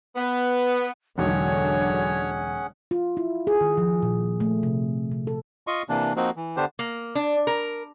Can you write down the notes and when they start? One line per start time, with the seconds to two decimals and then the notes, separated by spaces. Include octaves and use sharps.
0.16 B3
1.18 E1 B1 D3 F#3 C#4 G#4 C#5 F#5
2.91 F4
3.17 E4
3.47 G#4
3.61 D#3
3.78 F3
4.02 A#2
4.40 A3
4.63 C3
5.12 C3
5.27 A4
5.67 F4 D#5 C6 C#6
5.89 C3 E3 A#3 D4
6.16 F3 A#3 C4 D#4 F#4
6.36 E3
6.57 D3 B3 D4 G4 C5
6.79 A#3
7.15 D4
7.47 A#4